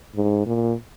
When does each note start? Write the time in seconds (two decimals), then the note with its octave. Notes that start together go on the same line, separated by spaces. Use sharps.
0.16 G#2
0.46 A#2